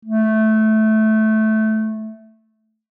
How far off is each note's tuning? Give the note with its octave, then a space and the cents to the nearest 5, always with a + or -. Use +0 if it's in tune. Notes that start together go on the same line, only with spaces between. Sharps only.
A3 -10